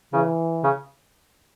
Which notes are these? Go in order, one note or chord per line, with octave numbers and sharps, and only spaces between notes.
C#3 E3
C#3